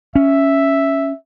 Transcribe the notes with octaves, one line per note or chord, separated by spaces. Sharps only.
C#4 E5